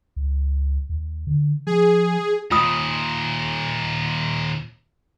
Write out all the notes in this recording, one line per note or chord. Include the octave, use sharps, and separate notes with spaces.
C#2
D#2
D3
F3 G#4
D#2 A#2 F4 D#6